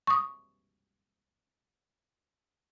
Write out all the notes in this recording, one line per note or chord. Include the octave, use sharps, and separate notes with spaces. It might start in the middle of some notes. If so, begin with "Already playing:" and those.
C#6 D#6